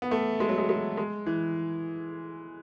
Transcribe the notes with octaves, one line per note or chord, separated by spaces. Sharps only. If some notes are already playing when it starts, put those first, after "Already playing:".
B3
A3
G#3
F#3
G#3
G#3
G#3
E3